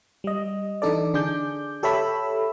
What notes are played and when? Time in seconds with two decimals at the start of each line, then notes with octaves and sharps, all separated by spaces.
0.24 G3 D#5
0.82 E3 D4 D#4 A4 D5
1.14 D3 D4 G#4 D6 G6
1.83 G4 A4 C#5 E5 B5 E6